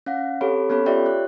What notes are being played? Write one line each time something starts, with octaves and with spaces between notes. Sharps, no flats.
C#4 F5 F#5
C4 G4 A4 C#5 B5
B3 C#4 A4 C#5 B5
F4 G4 C#5 D5 E5 G5
F#6